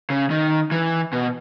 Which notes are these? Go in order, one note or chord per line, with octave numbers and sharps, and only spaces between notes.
C#3
D#3
E3
B2